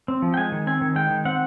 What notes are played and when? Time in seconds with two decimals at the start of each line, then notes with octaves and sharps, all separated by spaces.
0.08 C4
0.22 F3
0.34 G5
0.37 G#3 G#5
0.52 D#3
0.67 C4 G#5
0.81 D#3
0.96 G#3 G5
1.10 D#3
1.25 C4 F#5